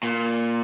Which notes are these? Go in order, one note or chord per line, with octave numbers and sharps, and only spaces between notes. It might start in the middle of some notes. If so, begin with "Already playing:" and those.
A#2